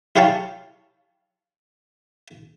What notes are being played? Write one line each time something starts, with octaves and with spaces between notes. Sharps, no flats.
E4 G4 C#5 F5 G5 A5